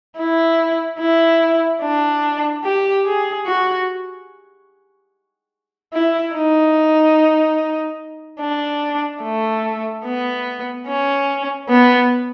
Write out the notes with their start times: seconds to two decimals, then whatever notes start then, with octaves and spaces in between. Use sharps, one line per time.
0.17 E4
1.00 E4
1.82 D4
2.64 G4
3.05 G#4
3.46 F#4
5.93 E4
6.35 D#4
8.40 D4
9.23 A3
10.05 B3
10.87 C#4
11.69 B3